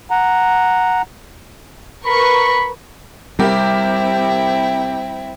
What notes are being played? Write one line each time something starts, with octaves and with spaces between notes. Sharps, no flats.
F#5 A#5
A#4 B4 B5 C#6
C3 G3 C4 E4 G4 A#4 G5